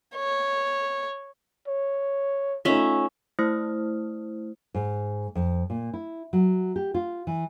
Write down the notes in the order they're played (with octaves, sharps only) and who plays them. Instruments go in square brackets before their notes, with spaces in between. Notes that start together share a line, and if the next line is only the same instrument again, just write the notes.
[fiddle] C#5
[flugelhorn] C#5
[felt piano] A3 D#4 F4 [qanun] C#4 E5
[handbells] A3 E4 C5 D#6 F6
[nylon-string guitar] G#2
F2
A#2
E4
F#3
G4
F4
E3